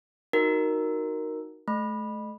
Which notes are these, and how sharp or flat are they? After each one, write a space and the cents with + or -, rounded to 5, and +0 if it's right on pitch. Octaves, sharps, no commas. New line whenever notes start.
D#4 +0 F#4 +0 A#4 +0
A3 -30 B5 -10